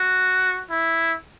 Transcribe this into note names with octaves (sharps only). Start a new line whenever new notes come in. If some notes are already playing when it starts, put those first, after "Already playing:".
Already playing: F#4
E4